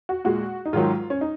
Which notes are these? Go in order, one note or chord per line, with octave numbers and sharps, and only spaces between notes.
F#4
A#2 G#3 F#4
D#4
G#2 D#3 F#3 F4
C#4
D#4